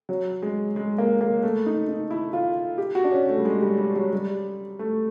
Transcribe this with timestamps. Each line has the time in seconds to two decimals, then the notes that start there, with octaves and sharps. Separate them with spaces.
0.09 F#3
0.42 G#3
0.76 G#3
0.98 A#3
1.21 A#3
1.43 A3
1.66 D#4
1.89 D#4
2.11 E4
2.33 F4
2.78 G4
2.95 F#4
3.04 D4
3.11 C#4
3.29 A3
3.38 G3
3.45 G#3
3.62 G3
3.78 G3
3.96 F#3
4.13 G3
4.79 A3